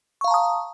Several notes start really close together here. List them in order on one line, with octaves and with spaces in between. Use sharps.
C#6 F5 A#5 A5 D#6